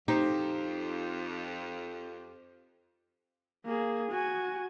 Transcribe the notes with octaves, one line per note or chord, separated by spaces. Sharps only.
F2 D#4 G4 C5
A#3 G#4
F#4 G#5